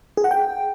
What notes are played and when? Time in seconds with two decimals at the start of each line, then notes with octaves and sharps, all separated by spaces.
0.17 G#4
0.24 F#5
0.31 G5